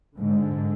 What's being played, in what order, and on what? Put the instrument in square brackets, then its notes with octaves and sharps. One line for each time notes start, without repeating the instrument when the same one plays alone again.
[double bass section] G#2 D3